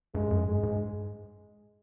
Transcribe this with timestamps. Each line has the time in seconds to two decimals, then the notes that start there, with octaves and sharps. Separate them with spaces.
0.15 G2 G#3
0.31 F#2
0.41 G#2
0.46 G2 G#3
0.63 G#2